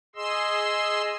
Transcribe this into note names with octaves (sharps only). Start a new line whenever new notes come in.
G#4 D#5 C6 E6